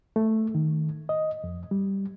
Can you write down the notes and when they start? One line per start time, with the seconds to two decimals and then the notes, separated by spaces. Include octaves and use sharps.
0.16 A3
0.55 D#3
1.09 D#5
1.44 F2
1.71 G3